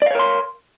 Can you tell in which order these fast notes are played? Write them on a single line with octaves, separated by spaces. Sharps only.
D5 F5 C#5 A#4 C6